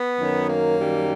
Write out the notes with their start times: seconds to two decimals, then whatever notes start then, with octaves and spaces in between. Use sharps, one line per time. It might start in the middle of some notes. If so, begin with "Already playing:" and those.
Already playing: B3
0.18 F#2 D#3 F#3
0.48 A#3
0.78 F#2 D#3 G3